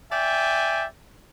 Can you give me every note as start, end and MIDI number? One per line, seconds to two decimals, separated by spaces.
0.11 0.84 74
0.11 0.84 76
0.11 0.84 79
0.11 0.84 80